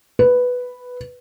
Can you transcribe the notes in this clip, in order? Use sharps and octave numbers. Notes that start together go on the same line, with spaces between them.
B4